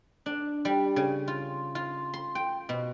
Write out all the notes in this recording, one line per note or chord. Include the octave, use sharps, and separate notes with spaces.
D4
G3
C#3
F4
F4
C6
G5
B2